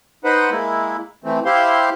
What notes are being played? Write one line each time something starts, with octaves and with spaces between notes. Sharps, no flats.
D#4 B4 C5 F#5
G#3 A#3 E4
E3 A3 C4
E4 G4 C5 F5 C6